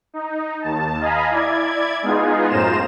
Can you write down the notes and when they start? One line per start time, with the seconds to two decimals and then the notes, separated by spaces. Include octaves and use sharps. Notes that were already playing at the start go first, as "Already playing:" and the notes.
0.14 D#4
0.62 D#2 A5
1.00 D#5 F5 G#5 A#5 B5
1.31 E4 D5 G#6
2.02 G#3 B3 D#4 F4 G#4
2.50 F#2 A2 F4 C5 A#5 E7